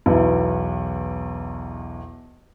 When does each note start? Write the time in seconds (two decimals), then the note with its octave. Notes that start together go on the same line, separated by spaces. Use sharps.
0.06 B1 E2